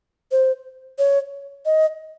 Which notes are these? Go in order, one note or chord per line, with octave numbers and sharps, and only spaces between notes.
C5
C#5
D#5